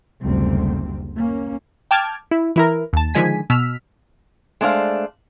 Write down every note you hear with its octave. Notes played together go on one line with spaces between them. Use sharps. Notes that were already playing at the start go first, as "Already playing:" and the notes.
F#1 D2 C3 G3 C4
A#3 C#4
G5 A5 D6 F6 G#6
E4
E3 E4 A#4
D#2 A5
D3 D#3 F3 G#3 G#5 B6
B2 E6 F6 B6
G#3 A3 D4 C5 F5